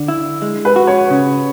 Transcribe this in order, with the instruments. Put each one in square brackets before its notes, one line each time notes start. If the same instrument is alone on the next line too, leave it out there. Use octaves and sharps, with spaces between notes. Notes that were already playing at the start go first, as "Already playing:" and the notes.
Already playing: [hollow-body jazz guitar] D3
E4
G#3
[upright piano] B4
[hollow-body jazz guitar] F#4
[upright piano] C#5
[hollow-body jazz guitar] C#3